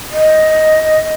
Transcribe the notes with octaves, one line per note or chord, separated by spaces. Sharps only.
D#5